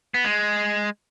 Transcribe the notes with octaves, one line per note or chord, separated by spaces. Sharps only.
B3
G#3